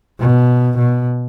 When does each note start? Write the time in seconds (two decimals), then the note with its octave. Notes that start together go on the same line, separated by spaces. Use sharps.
0.20 B2
0.79 B2